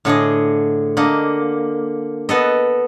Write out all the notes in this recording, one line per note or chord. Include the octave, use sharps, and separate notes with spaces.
A2 D3 G#4 D#5
D3 A#3 D#5
B3 A4 D#5